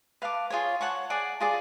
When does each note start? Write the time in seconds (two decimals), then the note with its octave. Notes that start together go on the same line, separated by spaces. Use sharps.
0.22 B4 F5 A5 D6
0.50 F4 G#4 C#5
0.81 C#5 F#5 A5 C#6
1.10 G#4 D5 F#5 A5
1.40 F4 G#4 D5